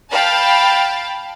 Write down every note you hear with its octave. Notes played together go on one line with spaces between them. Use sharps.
F5 G5 A5 B5